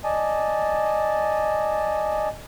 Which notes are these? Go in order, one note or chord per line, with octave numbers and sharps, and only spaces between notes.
D5 D#5 G#5 A5